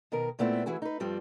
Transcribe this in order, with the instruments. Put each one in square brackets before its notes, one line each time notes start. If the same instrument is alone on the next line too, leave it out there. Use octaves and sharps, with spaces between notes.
[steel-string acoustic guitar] B2 D#3 A#4
A#2 A3 B3 C4 E4
E3 E4 F#4 G#4 G#5
D#4 B4
G2 F3 G3 C4